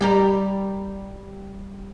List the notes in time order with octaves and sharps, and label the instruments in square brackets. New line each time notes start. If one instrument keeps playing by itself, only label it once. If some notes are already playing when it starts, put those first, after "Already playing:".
[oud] G3 G4 A#4